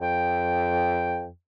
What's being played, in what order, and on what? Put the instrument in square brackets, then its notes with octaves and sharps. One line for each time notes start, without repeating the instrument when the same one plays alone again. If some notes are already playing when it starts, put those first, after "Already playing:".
[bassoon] F2 [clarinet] G5